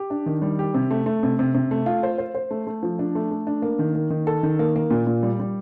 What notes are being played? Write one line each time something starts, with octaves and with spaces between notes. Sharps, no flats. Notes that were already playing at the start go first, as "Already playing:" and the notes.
Already playing: G4
D4
D#3
G3
G4
C3
A3
A3
C3
C3
C3
A3
F4
C5
C5
C5
A3
A3
F3
D4
A3
A3
D4
A#3
D#3
A#3
D#3
A4
D#3
A#3
A#3
A#2
A#2
G3
G3